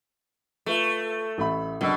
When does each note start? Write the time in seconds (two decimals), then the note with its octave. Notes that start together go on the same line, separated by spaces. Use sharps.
0.66 A3 F4 B4
1.38 A1 E5 B5
1.81 F#1 B2 D4 E6